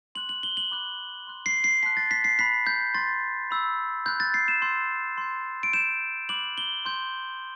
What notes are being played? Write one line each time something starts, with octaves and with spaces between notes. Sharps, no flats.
C6 F#6 F#7
F#7
G7
F#7
B5 D6 F#6
C6 F#6
C7
C7
A5 C6 F#6 B6
A6
B6
C7
B5 F#6 B6
G6
C6 G6 A6
B5 E6 G6
B5 F#6 G6
A6
C7
E7
C6 E6 G6
C6 G6
D7
C6 G6 E7
B5 D6 F#6 F#7
G7
C6 G6